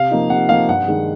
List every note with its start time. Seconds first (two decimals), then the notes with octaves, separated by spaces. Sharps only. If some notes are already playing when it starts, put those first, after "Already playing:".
Already playing: C3 F5
0.11 F3 A#3 D#4
0.30 C3 F#5
0.49 F3 A#3 D#4 F5
0.68 G2 F#5
0.88 D#3 G#3